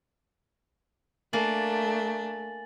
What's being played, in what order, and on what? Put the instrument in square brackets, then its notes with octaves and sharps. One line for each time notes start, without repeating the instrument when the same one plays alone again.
[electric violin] A3 [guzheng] A#3 [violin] D4 [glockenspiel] G#5 A6 F#7